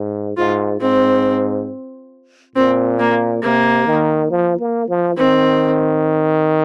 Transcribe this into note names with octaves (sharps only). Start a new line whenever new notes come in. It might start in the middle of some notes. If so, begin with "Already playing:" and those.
Already playing: G#2
G#2 F4
G#2 C4
A#2 C4
A#3
C3 A#3
D#3
F3
A#3
F3
D#3 C4